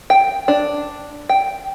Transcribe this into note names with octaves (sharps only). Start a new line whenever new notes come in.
G5
D4
G5